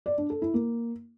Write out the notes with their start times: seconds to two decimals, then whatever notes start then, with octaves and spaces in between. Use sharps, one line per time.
0.06 D5
0.18 D4
0.30 A4
0.42 E4
0.54 A#3